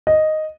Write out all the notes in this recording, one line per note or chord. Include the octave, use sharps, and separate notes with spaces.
D#5